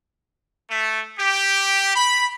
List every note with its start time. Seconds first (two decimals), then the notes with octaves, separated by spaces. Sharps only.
0.69 A3
1.19 G4
1.94 B5